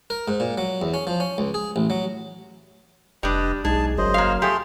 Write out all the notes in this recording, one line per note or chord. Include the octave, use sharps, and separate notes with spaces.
A#4
G#2
A#2
F#3
E2
C#4
F3
C#4
C#2
G#4
A1
F#3
F1 G3 D4 B4 D#5
B1 G#2 G#4 A5
G1 F#2 C5 D#5
A#3 F5
F3 A3 G4 G#4 C6